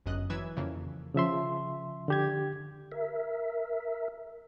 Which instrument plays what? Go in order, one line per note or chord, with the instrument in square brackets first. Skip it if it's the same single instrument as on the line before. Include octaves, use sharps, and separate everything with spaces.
[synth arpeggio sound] G1 F#2 D#5 F#6
E3 F#3 B4 E6 G#6
F2 C#3 E3 A#3
[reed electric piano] C#3 F3 E5 C6
D3 G4 G#6
[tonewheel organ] A#4 E5